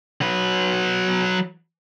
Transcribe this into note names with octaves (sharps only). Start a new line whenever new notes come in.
F#3 B4